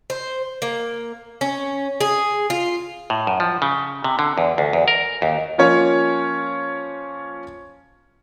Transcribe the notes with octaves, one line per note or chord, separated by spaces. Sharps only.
C5
A#3
C#4
G#4
F4
A2
F#2
F3
C#3
C3
D3
E2
D2
E2
A#4
D#2
F3 A#3 C#4 F4 C#5